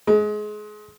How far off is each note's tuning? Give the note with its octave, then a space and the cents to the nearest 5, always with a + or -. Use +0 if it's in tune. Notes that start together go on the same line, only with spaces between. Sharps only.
G#3 +25